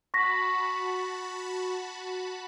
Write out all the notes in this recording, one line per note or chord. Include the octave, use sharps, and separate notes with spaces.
F#4 A5 B5 C#6 A#6 B6